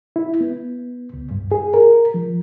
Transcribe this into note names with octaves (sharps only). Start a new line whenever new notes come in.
E4
B3
C#2
G2
G#4
A#4
F3